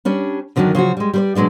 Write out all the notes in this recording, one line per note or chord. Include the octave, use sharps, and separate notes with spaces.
G3 C#4 D4
F#2 D3 D#3 F3 F#3 D4
C#3 F3 F#3 F#4
G3 G#3
G3 C5 D5
B2 F#3 G#3 D4 D5